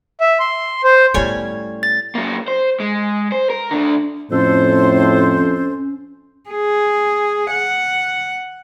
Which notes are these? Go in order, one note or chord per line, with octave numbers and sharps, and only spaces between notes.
E5
C6
C5
A2 G3 A3 B3 C#4 C#5 G#5
A6
F#3 A#3
C5
G#3
C5
A#4
D2 D3
F2 A2 C#4 A4 C5
G#4
F#5